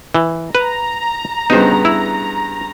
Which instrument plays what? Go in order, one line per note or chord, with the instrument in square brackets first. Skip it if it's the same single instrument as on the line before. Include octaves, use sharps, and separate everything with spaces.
[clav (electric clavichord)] E3
[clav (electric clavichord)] B4 [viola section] A#5
[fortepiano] G2 C#3 B3 [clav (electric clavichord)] D#4 C5
[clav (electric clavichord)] E4